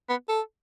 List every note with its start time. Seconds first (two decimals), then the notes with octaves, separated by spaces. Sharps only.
0.09 B3
0.29 A4